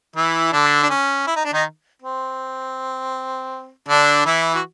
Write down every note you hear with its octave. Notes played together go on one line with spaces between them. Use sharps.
E3 E4
D3 D4
D4
C#4
E4
D#4
D4
D#3 D#4
C4
D3 D4
E3 E4
F#4